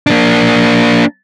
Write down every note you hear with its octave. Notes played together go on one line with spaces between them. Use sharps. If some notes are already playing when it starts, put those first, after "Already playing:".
A#3 D4